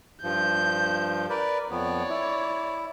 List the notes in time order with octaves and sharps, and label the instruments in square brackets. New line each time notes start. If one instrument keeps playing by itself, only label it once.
[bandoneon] G2 F3 [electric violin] G6
[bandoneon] A#4 B4 D5
[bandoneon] F2 B3 [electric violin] C#5 D5
[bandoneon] E4